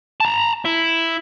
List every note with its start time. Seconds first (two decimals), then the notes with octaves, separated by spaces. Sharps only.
0.21 A5 A#5
0.65 E4